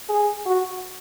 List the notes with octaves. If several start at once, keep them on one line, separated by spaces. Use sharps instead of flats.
G#4
F#4